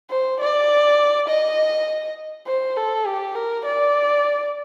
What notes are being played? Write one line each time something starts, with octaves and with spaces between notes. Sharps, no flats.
C5
D5
D#5
C5
A4
G4
A#4
D5